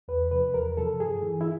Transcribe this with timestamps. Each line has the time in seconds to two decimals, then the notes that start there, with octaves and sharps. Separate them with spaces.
0.08 E2 B4
0.31 C3 F3 B4
0.54 E2 A#4
0.77 C3 F3 A4
0.99 G2 G#4
1.22 E3
1.41 E4